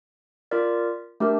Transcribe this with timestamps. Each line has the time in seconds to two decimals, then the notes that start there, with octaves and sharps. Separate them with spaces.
0.51 F4 A#4 D5
1.20 A3 D4 G4 A#4